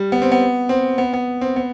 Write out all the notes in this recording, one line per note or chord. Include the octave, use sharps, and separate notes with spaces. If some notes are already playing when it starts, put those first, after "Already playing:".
Already playing: G3
B3
C4
B3
C4
B3
B3
C4
B3